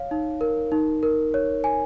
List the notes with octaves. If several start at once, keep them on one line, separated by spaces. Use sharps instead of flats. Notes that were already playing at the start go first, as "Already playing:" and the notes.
Already playing: C#5 F5
D#4
A#4
D#4
A#4
C#5
G#5